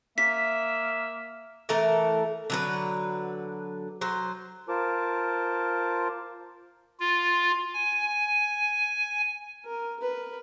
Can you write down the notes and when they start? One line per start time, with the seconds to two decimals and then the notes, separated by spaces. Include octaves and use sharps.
0.18 A#3 E5 B6
1.69 E3 A3 A4 A#4
2.50 D3 F#3 B4
4.01 F#3 C5
4.69 F4 A#4 C5 A5 D6
7.00 F4
7.74 G#5
9.65 A#4
10.00 A#4 B4